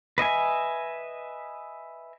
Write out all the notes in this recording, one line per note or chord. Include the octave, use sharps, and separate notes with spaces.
B4 D#5 E5 G#5